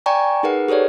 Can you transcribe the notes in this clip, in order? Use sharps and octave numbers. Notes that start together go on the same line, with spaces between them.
D5 G5 G#5 A#5 C#6
D#4 G#4 A#4 B4 F#5
G4 A4 B4 C#5 D5